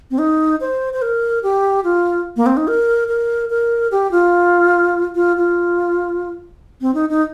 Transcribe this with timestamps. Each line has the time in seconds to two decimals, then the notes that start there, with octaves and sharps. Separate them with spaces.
0.11 C4
0.18 D#4
0.61 C5
0.93 C5
1.02 A#4
1.43 G4
1.84 F4
2.37 A#3
2.46 C4
2.57 D#4
2.68 A#4
3.08 A#4
3.50 A#4
3.91 G4
4.11 F4
5.15 F4
5.37 F4
6.81 C4
6.94 D#4
7.09 D#4